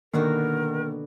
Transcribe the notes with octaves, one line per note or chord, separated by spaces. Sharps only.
B2 D3 D#3 A#3 F#4 A#4